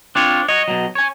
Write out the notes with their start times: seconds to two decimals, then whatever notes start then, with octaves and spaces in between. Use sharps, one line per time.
0.15 C4 D4 F4 C#5
0.48 F#4 C#5 D#5
0.68 B2 F#3
0.95 C#5 G#5